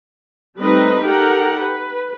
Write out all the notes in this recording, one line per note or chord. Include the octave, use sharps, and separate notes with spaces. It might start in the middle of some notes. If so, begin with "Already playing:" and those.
G3 A3 C4 D#4 B4 D#5
D#4 G4 A4 A#4 F#5 G5
B4